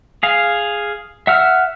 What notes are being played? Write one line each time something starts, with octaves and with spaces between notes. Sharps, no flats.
G#4 F5
E5 F#5 E6 F6